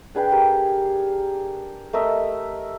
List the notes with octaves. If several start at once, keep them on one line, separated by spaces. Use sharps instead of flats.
D4 G#4 B4 G5
G4 G#4 A#4
A3 A#4 D#5 E5